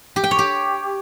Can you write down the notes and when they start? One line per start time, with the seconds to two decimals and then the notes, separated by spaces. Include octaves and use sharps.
0.16 G4
0.24 G5
0.31 C#5
0.39 G4